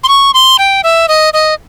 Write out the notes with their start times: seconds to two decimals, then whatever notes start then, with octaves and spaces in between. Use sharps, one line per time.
0.03 C6
0.08 C#6
0.34 C6
0.59 G5
0.84 E5
1.08 D#5
1.33 D#5